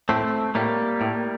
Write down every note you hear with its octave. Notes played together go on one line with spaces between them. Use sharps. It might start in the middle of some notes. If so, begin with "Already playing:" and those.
A2 A3 C4
A2 G3 A#3
A2